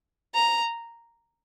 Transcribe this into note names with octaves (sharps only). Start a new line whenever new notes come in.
A#5